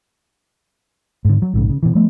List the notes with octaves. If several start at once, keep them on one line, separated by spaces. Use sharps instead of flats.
G#2 D3
F#3
A#1 G#2 C#3
C#3
B2 E3
F3 G3 A3 B3